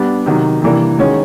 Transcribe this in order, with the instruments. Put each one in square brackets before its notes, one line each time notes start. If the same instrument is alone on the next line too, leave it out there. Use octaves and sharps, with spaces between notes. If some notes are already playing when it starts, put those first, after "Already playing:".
Already playing: [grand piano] G3 B3 D4
C3 D#3 F#3
C3 E3 G3 A#3 D4
D#3 G#3 C#4 F#4